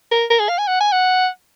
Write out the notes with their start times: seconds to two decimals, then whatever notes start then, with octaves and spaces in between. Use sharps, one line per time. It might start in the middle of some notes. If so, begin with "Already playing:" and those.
0.11 A#4
0.31 A#4
0.40 G#4
0.49 F5
0.58 G#5
0.67 F#5
0.80 G#5
0.92 F#5